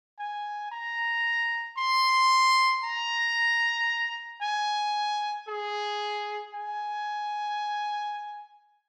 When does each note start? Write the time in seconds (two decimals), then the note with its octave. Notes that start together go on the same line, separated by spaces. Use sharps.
0.19 G#5
0.72 A#5
1.78 C6
2.83 A#5
4.42 G#5
5.48 G#4
6.54 G#5